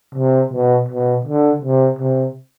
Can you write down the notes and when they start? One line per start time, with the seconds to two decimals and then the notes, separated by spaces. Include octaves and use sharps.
0.15 C3
0.52 B2
0.89 B2
1.25 D3
1.62 C3
1.99 C3